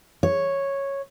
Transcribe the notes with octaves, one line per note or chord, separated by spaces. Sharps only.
C#5